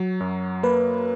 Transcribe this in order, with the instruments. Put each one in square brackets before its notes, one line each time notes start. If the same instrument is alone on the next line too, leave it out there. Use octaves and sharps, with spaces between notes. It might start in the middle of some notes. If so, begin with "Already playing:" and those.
Already playing: [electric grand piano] F#3
F#2
[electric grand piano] A#3 [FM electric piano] B4